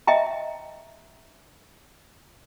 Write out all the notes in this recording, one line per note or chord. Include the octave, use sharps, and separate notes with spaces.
D#5 E5 G5 A#5